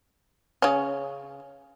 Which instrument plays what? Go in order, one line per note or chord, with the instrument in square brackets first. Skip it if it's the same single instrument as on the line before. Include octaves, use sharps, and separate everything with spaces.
[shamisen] C#3 C#4